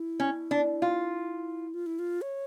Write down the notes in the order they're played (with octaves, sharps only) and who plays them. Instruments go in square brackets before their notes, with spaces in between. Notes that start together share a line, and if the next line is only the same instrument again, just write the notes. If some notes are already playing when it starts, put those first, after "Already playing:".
Already playing: [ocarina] E4
[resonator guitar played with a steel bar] C#4
D4
F4
[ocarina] F4
E4
F4
C#5